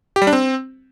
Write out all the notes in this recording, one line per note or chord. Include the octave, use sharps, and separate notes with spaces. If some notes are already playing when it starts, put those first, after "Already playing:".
G4
G3
D4
C4